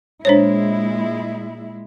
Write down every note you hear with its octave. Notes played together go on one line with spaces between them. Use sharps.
A#2 G#3 D4 E4 C5 C#5